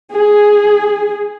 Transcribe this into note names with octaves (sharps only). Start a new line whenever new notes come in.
G#4